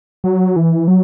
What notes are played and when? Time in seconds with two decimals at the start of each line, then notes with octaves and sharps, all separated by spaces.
0.24 F#3
0.56 E3
0.88 F#3